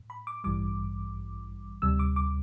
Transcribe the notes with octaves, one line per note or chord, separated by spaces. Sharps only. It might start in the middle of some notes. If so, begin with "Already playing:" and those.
Already playing: A2
B5
D6
A1 G2 E3 G3 D6
D2 C3 G3 E6
D6
D6